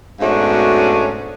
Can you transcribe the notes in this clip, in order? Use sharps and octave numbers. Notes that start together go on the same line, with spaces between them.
G#2 B2 A3 C#4 D4 F#4